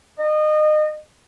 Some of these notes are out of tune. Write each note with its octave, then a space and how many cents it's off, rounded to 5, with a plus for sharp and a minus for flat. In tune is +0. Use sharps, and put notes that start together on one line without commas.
D#5 -30